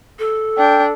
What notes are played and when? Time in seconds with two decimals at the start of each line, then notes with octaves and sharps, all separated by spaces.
0.19 A4
0.58 D4 G5